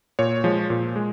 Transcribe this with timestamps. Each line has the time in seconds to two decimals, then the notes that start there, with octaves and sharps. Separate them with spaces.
0.19 A#2 C#5
0.44 F3 G#3
0.70 A#2
0.96 G#3